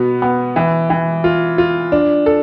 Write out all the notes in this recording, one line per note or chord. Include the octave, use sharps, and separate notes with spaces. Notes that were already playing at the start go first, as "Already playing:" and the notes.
Already playing: B2 B3
B3
E3
E3
F4
F4
D4
A4